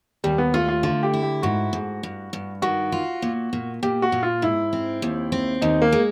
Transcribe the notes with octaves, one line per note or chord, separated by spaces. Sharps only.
D#2 G3
B3
A3 F4
F4
D3 F4
G4
E4
G4
G#2 F#4
G#2
G2
G2
D#3 F#4
F4
A#2
A#2
A#2 G4
F#4
A#2
F4
G#2 E4
C4
D#2
C4
D#2 D#4
A#3
G#3